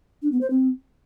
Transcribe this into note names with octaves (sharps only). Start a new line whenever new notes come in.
D4
B3
C5
C4